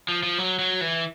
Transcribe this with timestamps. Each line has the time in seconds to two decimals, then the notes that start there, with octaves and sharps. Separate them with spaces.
0.08 F3
0.23 F3
0.38 F#3
0.59 F#3
0.81 E3